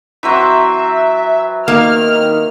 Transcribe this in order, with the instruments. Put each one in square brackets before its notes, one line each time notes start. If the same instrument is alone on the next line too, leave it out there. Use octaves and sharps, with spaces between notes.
[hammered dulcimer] E3 F#3 C4 [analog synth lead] E5
[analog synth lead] D#3 [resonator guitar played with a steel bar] A#3 [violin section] F6